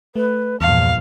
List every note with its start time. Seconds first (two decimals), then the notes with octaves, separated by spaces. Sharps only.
0.16 A3 B4
0.61 A#1 E2 G2 F5 A5